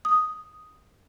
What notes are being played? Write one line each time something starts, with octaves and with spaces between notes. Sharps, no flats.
D#6